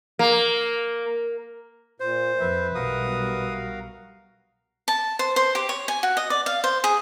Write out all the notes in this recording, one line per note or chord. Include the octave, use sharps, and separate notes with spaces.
A#3
A#2 C5
F2 B4 E5
B1 G3 F#4 A#4 F5 D#6
A5
C5
C5
G4
C#5
G#5
F#4
D#5
D5
F5
C5
G#4